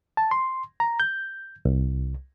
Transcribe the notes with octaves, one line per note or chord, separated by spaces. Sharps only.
A5
C6
A#5
G6
C2